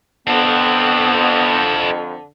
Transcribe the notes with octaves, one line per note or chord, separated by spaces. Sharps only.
F2 D3 B3 C4 E4